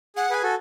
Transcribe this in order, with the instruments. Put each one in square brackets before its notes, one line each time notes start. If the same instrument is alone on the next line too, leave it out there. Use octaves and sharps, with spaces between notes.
[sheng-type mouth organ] G#4 [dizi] F#5
[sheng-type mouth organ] G#4 B4 [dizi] G#5
[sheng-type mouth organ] F#4 A4